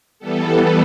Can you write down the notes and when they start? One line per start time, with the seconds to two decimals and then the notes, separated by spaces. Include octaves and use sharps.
0.19 E3 G3 B3 A4